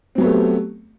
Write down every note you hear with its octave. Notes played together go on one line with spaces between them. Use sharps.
F#3 A3 B3 C4 G4